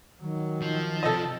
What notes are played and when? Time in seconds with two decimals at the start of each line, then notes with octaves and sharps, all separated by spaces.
0.21 D#3 F#3
0.62 F3
1.03 C3 A4 D#5